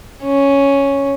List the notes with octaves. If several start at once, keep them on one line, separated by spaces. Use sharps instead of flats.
C#4